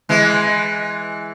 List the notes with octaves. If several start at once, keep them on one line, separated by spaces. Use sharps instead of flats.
E3 G#3